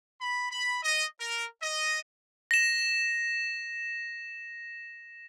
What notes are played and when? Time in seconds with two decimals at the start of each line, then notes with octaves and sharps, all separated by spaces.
0.21 B5
0.51 B5
0.83 D#5
1.19 A#4
1.61 D#5
2.51 A#6 E7